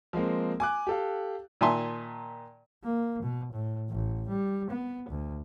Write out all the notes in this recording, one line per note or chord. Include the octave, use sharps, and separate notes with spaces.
F3 G#3 A#3 C4
G#5 D6 F#6
G4 A4 F5
A#2 D#3 E5 G#5 A5 C6
A#3
B2
A2
A1
G3
B3
D2